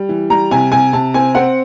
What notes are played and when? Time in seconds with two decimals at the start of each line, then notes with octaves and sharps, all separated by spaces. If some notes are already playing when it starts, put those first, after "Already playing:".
Already playing: G3
0.09 E3
0.30 G3 A#5
0.51 C3 G#5
0.72 C3 G#5
0.93 C3 A5
1.14 C4 G#5
1.35 C4 F#5